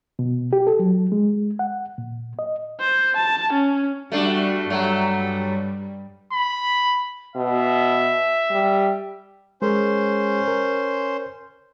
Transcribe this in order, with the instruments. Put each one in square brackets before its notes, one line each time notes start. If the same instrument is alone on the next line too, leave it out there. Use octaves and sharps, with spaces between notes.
[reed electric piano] B2
G4
A4
F#3
G#3
F#5
A#2
D#5
[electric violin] C5
A5
C#4
[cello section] G3 F#4 [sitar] A3 D4
[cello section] G2 G3 [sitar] F#3 A3
[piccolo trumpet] B5
[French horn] B2 [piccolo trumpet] E5
[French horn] G3
[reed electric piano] G#3 G#4 A#4 [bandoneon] C#4 C5
[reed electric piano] A#4